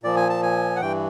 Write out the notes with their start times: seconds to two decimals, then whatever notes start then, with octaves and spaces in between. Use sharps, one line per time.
0.03 A#2 F3 D5
0.16 G#5
0.29 A5
0.43 G#5
0.76 F#5
0.81 G2 E3 G5